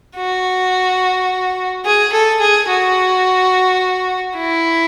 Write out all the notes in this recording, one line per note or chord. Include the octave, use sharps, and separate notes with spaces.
F#4
G#4
A4
G#4
F#4
E4